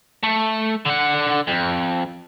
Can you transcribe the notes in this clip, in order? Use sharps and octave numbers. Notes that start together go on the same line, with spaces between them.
A3
D3 F#5
F2